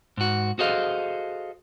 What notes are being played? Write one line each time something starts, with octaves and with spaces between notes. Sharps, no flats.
G#2 F#4
F#4 G#4 A4 C5 D#5 F5